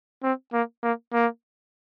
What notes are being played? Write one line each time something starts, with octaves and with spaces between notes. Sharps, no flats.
C4
A#3
A#3
A#3